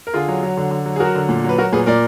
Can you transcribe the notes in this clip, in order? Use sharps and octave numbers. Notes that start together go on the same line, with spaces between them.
A#4
D3 F4 G#4
F#3
F#3
D3
D3
F#3
G#4
F#3 F#4 A#4
D3
A#2
F#3 B4
F#3 F#4 A#4
A#2 G#4 B4
A#2 A#4 D5